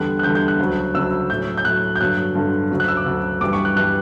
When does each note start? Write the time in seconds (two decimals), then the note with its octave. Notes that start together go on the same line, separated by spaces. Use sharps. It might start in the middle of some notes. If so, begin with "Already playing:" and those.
Already playing: E2 D3 G3 F#6
0.19 F#6
0.23 E2 D3 G3 G6
0.35 G6
0.48 F#6
0.59 D2 C#3 F#3
0.95 D2 C#3 F#3 E6
1.30 A2 F#3 G6
1.57 G6
1.65 A2 F#3 F#6
1.96 G6
2.00 G2 D3 F#3 F#6
2.35 G2 D3 F#3
2.71 D2 C#3 F#3
2.80 F#6
2.88 E6
2.97 D6
3.06 D2 C#3 F#3
3.41 G2 E3 G3 D6
3.53 C#6
3.65 F#6
3.76 G2 E3 G3 F#6